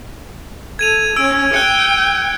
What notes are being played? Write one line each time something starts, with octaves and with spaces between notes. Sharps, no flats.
A4 G#6 D#7 F7
C#4 E6 D7
G5 F#6 C#7